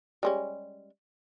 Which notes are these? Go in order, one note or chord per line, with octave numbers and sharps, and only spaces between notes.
G3 G#3 C#4